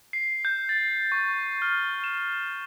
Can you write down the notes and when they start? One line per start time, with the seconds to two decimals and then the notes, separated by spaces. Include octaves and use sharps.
0.13 C7
0.45 G6
0.69 A6
1.12 C#6
1.62 F6
2.04 E7